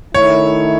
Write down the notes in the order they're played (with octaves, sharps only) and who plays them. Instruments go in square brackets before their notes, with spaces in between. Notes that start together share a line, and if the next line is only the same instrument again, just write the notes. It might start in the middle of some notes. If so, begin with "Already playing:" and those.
[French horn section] D#3 A3 E4 [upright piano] C#5